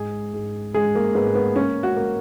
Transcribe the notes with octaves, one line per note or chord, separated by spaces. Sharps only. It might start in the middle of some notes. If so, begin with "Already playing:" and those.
Already playing: G#2 G#4
G#2
G#3 G#4
A#3
G#2 B3
B3
A#3 C#4
F#4
A#3